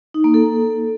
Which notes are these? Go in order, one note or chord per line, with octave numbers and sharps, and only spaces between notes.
D#4
A#3
A4